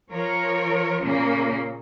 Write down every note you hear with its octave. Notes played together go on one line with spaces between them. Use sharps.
F3 A#4 C#5
A#2 C#3 A#3